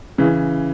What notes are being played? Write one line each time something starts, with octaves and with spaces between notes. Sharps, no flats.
C#3 E3